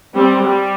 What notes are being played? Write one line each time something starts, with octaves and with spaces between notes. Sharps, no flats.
G3 C4
G3